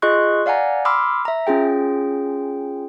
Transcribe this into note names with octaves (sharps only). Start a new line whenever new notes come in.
F4 G#4 D#5 C6 C#6 F#6
D5 F5 F#5 G#5 A#5
B5 C6 D6 E6 F6
E5 A#5
C#4 F4 G#4 G5